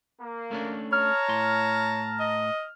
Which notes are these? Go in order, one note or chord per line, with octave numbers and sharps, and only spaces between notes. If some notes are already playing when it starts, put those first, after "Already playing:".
A#3
A3 C#4 D4
C#5 A5 A#5 F6
A2 C6
D#5